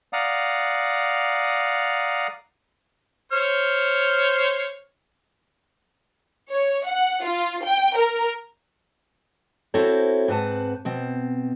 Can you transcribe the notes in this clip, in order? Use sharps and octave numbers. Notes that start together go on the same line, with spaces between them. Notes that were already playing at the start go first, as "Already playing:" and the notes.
D5 F5 F#5 A#5 D#6
C5 C#5 F6
C#5
F#5
F4
G5
A#4
C4 E4 F#4 A4 C5 C#5
G#2 C4 B4 F#5 A5
B2 C4